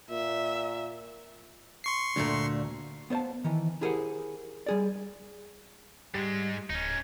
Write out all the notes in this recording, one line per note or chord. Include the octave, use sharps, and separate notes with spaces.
A#2 E5
C6 C#6 C7
D2 A#2 A3 D4
B3 C5 C#5 F5 A5
D#3 E3
E4 G4 G#4 A#4 C5 F#5
G3 G#4 D5
G#2 G3 G#3
D1 C#4 D#4